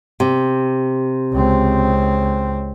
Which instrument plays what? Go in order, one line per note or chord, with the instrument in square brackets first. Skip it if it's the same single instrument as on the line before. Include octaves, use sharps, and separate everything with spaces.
[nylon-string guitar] C3
[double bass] C#2 C4